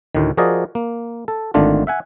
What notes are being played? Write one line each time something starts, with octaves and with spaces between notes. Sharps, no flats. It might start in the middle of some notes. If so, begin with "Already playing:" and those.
D2 A2 D#3
F3 F#4 G#4 A#4 D5 D#5
A#3
A4
G#1 D3 D#3 A3 D4 F4
E5 F#5 G#5